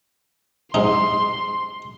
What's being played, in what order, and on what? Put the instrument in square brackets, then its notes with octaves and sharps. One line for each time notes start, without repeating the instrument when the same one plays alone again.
[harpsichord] G#2 D#4 [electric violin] C6